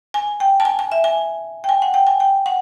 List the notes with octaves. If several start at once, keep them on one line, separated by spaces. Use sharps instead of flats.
G#5
G5
A5
G#5
G#5
E5
G#5
G5
G#5
F#5
G5
G#5
G5
F#5